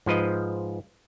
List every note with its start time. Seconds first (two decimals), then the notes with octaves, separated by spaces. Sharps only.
0.06 G#2 F3 B4 D#5